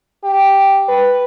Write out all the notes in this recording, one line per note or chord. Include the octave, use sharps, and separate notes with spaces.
G4
B4